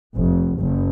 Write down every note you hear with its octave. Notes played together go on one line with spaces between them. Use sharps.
F1
F#1